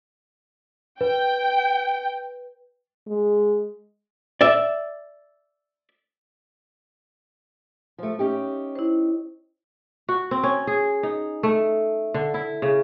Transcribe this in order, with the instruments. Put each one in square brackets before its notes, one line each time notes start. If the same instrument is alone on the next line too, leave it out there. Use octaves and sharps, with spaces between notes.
[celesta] B4 [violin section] G5
[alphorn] G#3
[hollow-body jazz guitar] D5 E5
[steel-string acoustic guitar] F3 A3
C#4 D#4 G4
[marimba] E4 C5
[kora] F#4
C4
C#4
G#4
D#4
A3
D3
E4
C#3